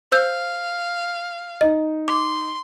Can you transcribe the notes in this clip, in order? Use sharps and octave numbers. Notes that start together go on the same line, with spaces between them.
C5 F5 E6 G6
D#4 D#5
C6 D6